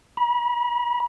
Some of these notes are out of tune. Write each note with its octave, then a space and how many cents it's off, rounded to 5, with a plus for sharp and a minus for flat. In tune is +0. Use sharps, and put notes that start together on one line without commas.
B5 -40